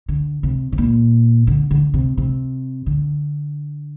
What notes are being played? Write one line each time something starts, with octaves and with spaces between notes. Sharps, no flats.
D3
C3
C3
A#2
D3
D3
C3
C3
D3